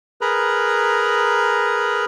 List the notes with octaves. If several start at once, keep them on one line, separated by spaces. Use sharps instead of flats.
G#4 A#4 B4 A#5 B5